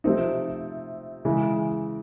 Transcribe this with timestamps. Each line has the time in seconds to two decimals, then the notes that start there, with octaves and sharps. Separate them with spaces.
0.04 C3 F3 A3 C4 D#4
1.25 C#3 E3 G#3